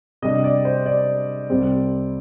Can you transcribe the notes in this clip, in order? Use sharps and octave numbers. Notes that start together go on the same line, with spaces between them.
C3 G3 D4 D#5
D5
C5
D5
C2 C3 G3 C4